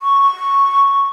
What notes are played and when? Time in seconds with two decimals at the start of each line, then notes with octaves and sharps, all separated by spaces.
0.01 C#6